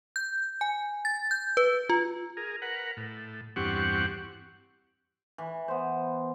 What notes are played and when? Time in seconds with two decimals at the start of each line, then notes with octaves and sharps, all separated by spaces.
0.16 G6
0.61 G#5
1.05 A6
1.31 G6
1.57 B4
1.89 F4
2.37 G#4 A#4
2.62 A#4 B4 F#5
2.97 A2
3.56 E2 G2 C4 G4 F#5 C#6
5.38 E3
5.68 B3 C5